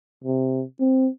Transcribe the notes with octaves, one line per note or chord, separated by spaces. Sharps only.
C3
C4